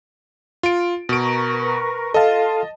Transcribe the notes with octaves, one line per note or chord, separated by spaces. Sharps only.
F4 D7
B2 A#4 B4 C#6 D7
F4 A4 D#5 F5 A5